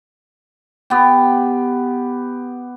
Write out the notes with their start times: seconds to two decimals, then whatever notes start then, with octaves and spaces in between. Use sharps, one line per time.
0.90 B3 G4